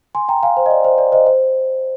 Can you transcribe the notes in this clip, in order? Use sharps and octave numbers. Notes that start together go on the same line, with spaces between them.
G#5 C6
G5 A#5
F5 G#5
C5
D#5
D5
C5
D5
C5 D#5
C5